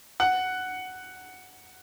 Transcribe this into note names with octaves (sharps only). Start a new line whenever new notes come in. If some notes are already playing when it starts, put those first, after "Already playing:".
F#5